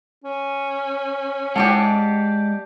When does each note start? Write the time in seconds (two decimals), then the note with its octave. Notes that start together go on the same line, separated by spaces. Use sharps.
0.24 C#4
1.56 G#3 G4 D5 F#5 A5